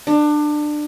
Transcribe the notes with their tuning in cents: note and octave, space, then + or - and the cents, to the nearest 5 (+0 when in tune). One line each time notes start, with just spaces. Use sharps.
D4 +25